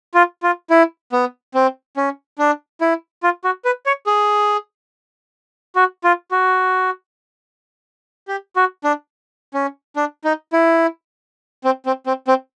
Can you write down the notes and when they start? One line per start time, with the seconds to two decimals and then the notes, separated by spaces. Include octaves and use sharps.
0.14 F4
0.43 F4
0.70 E4
1.12 B3
1.54 C4
1.97 C#4
2.38 D4
2.81 E4
3.23 F4
3.44 F#4
3.65 B4
3.86 C#5
4.06 G#4
5.76 F#4
6.04 F4
6.31 F#4
8.28 G4
8.56 F#4
8.84 D4
9.54 C#4
9.96 D4
10.24 D#4
10.53 E4
11.64 C4
11.86 C4
12.06 C4
12.28 C4